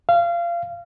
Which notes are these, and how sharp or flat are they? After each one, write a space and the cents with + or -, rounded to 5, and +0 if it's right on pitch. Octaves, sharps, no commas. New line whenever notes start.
F5 -25